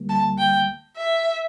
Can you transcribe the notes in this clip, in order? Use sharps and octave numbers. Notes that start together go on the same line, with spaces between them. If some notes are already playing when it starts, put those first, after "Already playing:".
Already playing: D2 D3 G3 A#3
A5
G5
E5